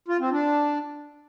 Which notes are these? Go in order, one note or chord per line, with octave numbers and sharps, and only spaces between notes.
F4
C4
D4